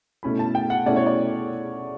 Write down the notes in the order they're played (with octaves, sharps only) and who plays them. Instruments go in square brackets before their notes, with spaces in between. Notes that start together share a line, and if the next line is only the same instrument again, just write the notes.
[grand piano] B2 A3 C#4 E4 B5
A5
G5
F#5
B2 A3 C#4 E4 D5
C#5
D5